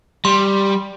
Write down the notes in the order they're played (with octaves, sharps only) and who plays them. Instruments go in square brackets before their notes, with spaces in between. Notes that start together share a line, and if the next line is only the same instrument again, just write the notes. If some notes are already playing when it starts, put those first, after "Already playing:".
[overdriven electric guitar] G3 [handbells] C6